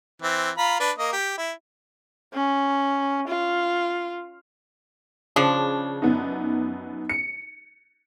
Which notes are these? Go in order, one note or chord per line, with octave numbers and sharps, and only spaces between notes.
E3 C4
F4 A#5 B5
D4 B4
A#3 D#5
G4
E4
C#4
F4
C#3 F3 D4
F#2 B3 D#4
C#7